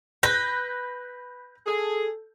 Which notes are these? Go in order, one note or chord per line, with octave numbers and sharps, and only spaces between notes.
B4 G6 A#6
G#4 A4